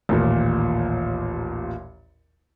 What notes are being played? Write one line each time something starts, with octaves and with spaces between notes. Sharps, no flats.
A1 D#2 A#2